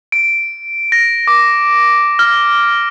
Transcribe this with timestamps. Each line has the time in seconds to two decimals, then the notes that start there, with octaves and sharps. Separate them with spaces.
0.12 D7
0.92 A#6
1.28 D6
2.19 F6